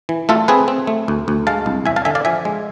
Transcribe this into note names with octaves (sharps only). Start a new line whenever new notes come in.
E3
A3 F4 A4
C4 G#4 B4
C4
A3
D2
D2
G#3 F5 A5
C2
E2 E5 G#5
F5 A5
D3 E5 G#5
D5 F5
F3 E5 G#5
G#3